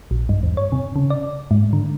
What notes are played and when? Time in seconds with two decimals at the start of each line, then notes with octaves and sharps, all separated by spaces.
0.11 A#1
0.29 G2
0.43 E2
0.57 C#5
0.72 C3
0.96 C#3
1.10 D5
1.51 G#2
1.73 D3